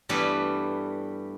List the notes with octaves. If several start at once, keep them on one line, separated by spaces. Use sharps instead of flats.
G2 E3 G3 A3 B3